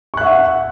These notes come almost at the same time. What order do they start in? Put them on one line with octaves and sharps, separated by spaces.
C#6 F#6 E5 F#5